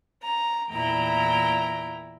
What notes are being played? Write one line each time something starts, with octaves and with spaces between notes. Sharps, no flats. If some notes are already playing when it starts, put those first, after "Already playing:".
A#5
E2 A#2 E4 G5 A#5